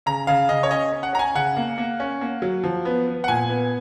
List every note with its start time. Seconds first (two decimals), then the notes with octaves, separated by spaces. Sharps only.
0.06 C#3 A#5
0.27 C#3 F5
0.49 C#3 D#5
0.63 C#5
0.71 C#4 D#5
0.92 C#4
1.03 F#5
1.13 C#4 A#5
1.19 G#5
1.35 C#3 F#5
1.57 A#3
1.78 A#3
2.00 C#4
2.21 A#3
2.42 F#3
2.64 F3
2.85 B3
3.07 B3
3.24 F#5
3.28 A#2 G#5
3.49 B3